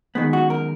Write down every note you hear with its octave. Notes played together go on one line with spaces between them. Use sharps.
F#2 D#3 G#3 B3
F#4
A#4